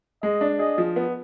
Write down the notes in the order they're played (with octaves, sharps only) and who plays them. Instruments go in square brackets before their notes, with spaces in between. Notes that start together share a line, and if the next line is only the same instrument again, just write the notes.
[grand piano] G#3 [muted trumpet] D#5
[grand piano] D4
[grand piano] G#4 [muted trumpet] D#5
[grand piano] F3
B3